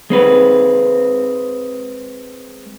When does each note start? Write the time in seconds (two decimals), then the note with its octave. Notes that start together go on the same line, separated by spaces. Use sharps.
0.10 G#3 C4 B4